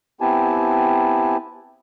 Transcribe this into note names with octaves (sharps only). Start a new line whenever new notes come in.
B3 C4 E4 G4 G#5 A5